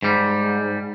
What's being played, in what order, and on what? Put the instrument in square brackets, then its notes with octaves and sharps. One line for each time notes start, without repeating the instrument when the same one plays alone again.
[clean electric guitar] G#2 G3